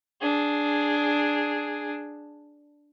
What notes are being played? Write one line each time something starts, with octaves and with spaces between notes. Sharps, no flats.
D4 G#4